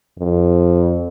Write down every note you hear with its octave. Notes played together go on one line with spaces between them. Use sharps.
F2